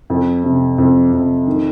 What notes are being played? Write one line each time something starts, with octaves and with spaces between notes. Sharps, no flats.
F2
C3
F2
F2
D#3